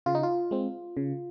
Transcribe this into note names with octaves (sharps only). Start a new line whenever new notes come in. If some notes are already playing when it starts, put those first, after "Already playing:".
C#3 F4
D#4
F4
G#3 C4
C#3